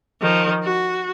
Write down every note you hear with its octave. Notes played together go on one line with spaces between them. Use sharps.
D#3 F3
F#4